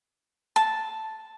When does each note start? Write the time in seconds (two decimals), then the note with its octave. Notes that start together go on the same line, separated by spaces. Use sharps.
0.56 A5